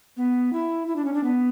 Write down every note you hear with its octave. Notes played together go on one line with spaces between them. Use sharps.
B3
E4
E4
D4
C#4
D4
B3